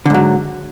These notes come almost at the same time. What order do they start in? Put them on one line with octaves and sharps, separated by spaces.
D3 G#2 F#3